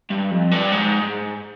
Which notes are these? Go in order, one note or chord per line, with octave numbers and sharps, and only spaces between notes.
G2
F2
G2
G#2
G#2